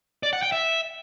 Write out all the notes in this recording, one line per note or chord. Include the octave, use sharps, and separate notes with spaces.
D5
F#5
G5
E5